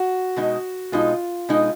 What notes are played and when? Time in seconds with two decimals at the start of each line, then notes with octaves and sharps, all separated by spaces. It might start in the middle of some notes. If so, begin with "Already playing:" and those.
Already playing: F#4
0.36 B2 G#3 D#4
0.92 B2 G#3 D#4 F4
1.49 B2 G#3 D#4